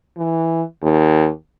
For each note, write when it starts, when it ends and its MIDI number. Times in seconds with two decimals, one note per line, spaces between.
0.17 0.63 52
0.82 1.29 39